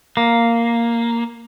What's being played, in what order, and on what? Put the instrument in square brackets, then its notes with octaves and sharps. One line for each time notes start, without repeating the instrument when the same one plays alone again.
[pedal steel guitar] A#3